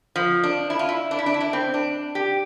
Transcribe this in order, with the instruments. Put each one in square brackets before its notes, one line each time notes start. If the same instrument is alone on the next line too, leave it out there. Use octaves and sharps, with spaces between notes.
[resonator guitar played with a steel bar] F3
D4
E4
F4
E4
D4
E4
D4
E4
D4
C4
D4
G4